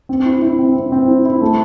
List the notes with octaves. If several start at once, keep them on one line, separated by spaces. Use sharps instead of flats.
C4
E4
E4
C4
C4
C4
E4
E4
A3